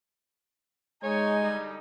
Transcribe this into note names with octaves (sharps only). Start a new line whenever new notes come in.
G#3 D#4 C#5 G#5
D3 G3